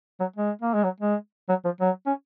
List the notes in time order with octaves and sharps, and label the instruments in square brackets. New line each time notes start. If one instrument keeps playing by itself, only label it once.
[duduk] F#3
G#3
A#3
G#3
F#3
G#3
F#3
F3
F#3
C#4